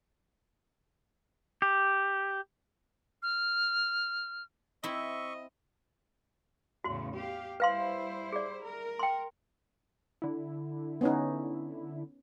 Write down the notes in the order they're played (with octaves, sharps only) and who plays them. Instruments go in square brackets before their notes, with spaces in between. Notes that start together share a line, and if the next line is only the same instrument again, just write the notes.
[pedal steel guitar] G4
[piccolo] F6
[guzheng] C4 E4 [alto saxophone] D#5 [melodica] E5 C#6
[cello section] E2 A2 C#3 [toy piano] F#4 C6
[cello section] G4 F5
[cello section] G3 E4 C5 [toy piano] B4 F5 C6
[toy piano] G#4 D5
[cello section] A#4
[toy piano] G5 C6
[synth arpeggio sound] D3 E4
[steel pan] B3 C#4 D#4